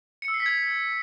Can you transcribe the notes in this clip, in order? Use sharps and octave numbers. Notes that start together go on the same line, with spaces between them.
C#7
E6
C7
B6
G#6